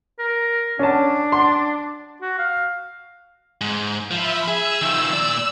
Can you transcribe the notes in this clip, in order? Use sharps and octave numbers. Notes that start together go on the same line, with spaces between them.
A#4
C#4 D4 A5
C6
F#4
F5
G#2
F3 E5 B5
G#4 E6
D#3 F3
A#2 D5